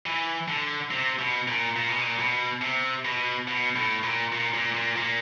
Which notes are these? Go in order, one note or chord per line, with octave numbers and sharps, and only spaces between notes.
E3
D3
C3
B2
A#2
A#2
B2
A#2
B2
C3
B2
B2
A2
A#2
A#2
A#2
A#2
A#2